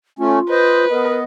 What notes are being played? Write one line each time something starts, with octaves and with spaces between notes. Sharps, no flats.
A3 C#4 F4
B4 C5 D#5
B3 A#4 D#5